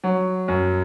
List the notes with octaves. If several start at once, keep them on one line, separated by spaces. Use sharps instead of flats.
F#3
F#2